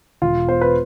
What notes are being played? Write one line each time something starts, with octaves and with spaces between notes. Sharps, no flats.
E1 F4
B2 C5
B4